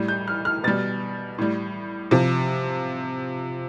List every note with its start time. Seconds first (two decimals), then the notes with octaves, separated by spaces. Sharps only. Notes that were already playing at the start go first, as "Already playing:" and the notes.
Already playing: A2 G3
0.08 G6
0.28 F6
0.45 F6
0.64 B2 G3 A6
1.38 A2 G3
2.11 C3 F3